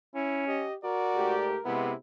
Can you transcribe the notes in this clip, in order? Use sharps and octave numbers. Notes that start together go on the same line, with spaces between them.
C#4 E4
G4 D#5
F#4 A#4 D5
G#2 A3 G4
C3 G#3 B3 E4